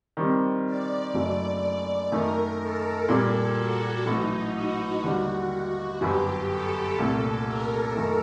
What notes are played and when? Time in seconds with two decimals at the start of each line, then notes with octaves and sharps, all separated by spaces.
0.17 D#3 G3 C4
0.65 D5
1.14 F#1 F#2 F#3 A3 D#4
2.12 F#2 D#3 A3 D#4 A#4
2.60 A4
3.09 A#2 G3 A#3
3.57 F#4
4.06 A1 A2 F#3 D#4
4.55 F#4
5.03 D#2 D3 G3
6.01 G1 F#2 F#3 G4
6.49 A4
6.98 C2 A#2 A3
7.47 A#4
7.95 F#2 D#3 A3